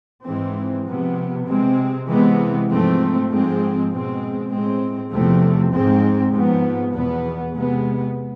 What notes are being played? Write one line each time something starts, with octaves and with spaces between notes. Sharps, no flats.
G#2 E3 G#3 C4
C3 F3 B3
C3 G#3 C4
C3 E3 G#3 B3
G#2 F3 A3 C4
G#2 F3 G#3 C4
B2 G#3 C4
A2 G#3 C4
E2 C3 F3 A3 C4
G#2 G#3 C4
G#2 F3 B3
E2 B2 B3
C3 G#3 B3